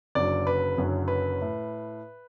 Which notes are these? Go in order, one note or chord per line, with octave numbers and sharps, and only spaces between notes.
F#1 F#2 D3 F#3 D5
B4
F#1 F#2 D3 F#3
B4
A2